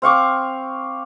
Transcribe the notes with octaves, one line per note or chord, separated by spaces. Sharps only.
C4 F5 C#6 D6